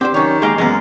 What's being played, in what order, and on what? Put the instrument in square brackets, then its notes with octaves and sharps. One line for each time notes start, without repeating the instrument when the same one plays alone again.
[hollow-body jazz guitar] C4 D4 C5 [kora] G4
[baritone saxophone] D#3 [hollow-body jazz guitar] F#3 C#4 C#5
[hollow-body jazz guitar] D2 G5 [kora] G#3 A#3 F5
[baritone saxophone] F#2 [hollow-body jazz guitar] E3 B3 [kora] G#3